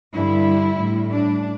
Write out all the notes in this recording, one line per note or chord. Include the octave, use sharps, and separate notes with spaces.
G2 D3 G3 E4
A2 G3
D4